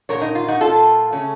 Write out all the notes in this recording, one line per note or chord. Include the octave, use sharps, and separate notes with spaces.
A#2 F#3 A#3 A#4 C#5
D#4
F4
D#4 F#4
A#2 F#3 A#3 F4 A4
C#3 A3 C#4